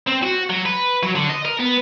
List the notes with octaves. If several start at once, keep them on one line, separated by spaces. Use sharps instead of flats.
C4
F#4
F#3
B4
F#3
D3
D#5
A#4
B3